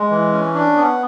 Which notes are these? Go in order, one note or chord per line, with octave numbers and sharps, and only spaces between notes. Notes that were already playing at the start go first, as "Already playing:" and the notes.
Already playing: G#3
E3
C#4
D4
B3